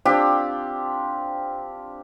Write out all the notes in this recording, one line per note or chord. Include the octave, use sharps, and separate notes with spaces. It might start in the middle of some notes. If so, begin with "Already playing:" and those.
C4 D4 F4 G4